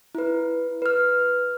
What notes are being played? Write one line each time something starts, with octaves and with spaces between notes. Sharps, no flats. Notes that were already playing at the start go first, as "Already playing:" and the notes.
E4 B4
B4 F6